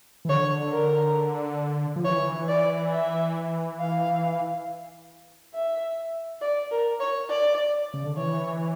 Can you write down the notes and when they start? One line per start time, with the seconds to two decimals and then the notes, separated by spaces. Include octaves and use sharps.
0.25 E3
0.29 D3 C#5
0.72 A#4
1.96 F3
2.04 E3 C#5
2.48 D5
2.92 E5
3.80 F5
5.54 E5
6.41 D5
6.71 A#4
7.00 C#5
7.29 D5
7.94 C#3
8.05 D3
8.16 E3 C#5